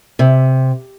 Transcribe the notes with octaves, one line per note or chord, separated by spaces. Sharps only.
C3